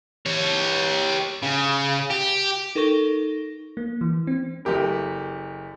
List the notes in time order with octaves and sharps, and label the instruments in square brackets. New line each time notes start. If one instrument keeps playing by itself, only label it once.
[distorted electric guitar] G4 C#5
C#3
G4
[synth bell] D#4 A4 A#4 C#6 A#6 G7
[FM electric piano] A#3
E3
C4
[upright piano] F#1 A3 G4 A#4